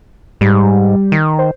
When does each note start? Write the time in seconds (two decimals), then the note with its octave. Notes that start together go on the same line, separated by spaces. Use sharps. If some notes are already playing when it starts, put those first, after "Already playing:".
0.41 G#2 G3
1.12 D#3
1.39 C5